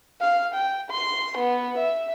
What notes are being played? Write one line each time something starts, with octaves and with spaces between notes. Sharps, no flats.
F5
G5
C6
B3
E5